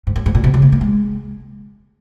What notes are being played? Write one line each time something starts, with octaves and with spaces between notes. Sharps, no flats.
G#2
F#2
G#2
A#2
B2
C#3
A#3
A#3
G#3